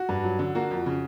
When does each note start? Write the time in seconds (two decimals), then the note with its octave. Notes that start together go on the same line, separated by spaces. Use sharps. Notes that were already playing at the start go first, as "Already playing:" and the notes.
Already playing: F#4
0.09 G2
0.24 F#3
0.39 D3
0.55 A#3 F#4
0.71 F2
0.86 C#3